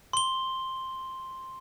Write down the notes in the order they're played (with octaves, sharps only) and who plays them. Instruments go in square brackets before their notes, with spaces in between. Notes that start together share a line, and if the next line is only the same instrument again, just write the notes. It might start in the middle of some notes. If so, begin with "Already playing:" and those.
[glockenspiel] C6 G7